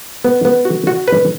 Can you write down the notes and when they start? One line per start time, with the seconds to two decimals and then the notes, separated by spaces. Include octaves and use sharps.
0.24 B3
0.45 B3
0.65 F#4
0.87 F#4
1.08 B4